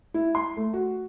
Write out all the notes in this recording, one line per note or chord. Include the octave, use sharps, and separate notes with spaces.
E4
C6
A3
F#4